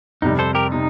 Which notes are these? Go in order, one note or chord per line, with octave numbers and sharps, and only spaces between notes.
F2 C3 G3 D#4
A4 C5
G4 A#4
C3 D#4